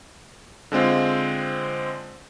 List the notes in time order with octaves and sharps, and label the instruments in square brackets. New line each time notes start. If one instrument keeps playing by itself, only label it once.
[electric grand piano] D3 G#3 C4 F4